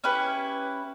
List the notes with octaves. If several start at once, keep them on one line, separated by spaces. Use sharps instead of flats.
C#4 E4 G4 B4